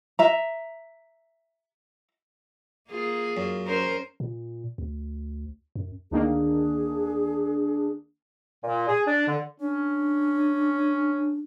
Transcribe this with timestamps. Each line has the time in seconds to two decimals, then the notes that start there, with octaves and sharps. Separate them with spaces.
0.19 E5 A#5
2.89 A#3 F4 G#4
3.37 F#2
3.67 C#4 A#4 C5
4.20 A#2
4.78 D2
5.76 F#2
6.11 D2 D#3 A#3 D4 G#4
8.64 A#2
8.89 G#4
9.07 D4
9.27 D3
9.60 C#4 D4